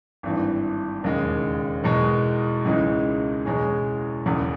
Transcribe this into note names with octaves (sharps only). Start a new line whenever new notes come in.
G#1 G2 E3
E1 D#2 C#3 G#3
E2 B2 G#3
C#2 C#3 E3 G#3 D#4
E2 B2 G#3 C#4 G#4
E1 E2 C#3